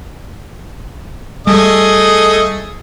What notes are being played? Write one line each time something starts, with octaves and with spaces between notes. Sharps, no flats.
G3 A3 G#4 D#5